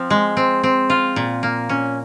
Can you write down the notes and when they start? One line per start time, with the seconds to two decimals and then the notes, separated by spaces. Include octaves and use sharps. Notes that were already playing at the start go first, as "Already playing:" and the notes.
Already playing: F3 C4
0.10 G#3
0.37 C4
0.63 C4
0.90 F4
1.16 A#2
1.43 A#3
1.69 C#4